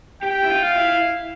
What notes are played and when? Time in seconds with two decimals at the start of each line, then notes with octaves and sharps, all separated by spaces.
0.22 G4 G5
0.44 E4
0.50 F4
0.63 F5
0.76 E4